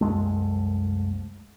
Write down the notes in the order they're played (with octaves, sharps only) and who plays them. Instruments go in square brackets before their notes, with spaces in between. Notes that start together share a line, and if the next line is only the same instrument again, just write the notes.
[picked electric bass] C2 F#2 G#3 A3